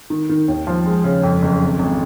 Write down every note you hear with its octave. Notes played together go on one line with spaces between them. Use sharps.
D#3
D#3
D#2
F3
G#3
C#3
F2
F#1
G#1
G#1